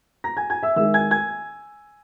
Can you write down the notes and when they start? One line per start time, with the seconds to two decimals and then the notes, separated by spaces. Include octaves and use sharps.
0.24 A#5 A#6
0.37 G#5 G#6
0.50 G#5 G#6
0.63 E5 E6
0.76 D#3 G#3 D#4 E5 E6
0.94 G#5 G#6
1.11 G#5 G#6